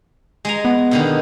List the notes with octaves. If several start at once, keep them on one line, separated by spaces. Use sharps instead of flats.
G#3 G#5 A#5
B3
B2 D3 D#3